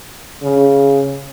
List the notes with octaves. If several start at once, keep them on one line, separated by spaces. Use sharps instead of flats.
C#3